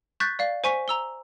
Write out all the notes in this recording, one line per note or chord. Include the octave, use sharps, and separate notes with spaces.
C#6 F#6 G6 A6 B6
D5 F5
C5 G#5 C#6 B6
A#5 E6 G7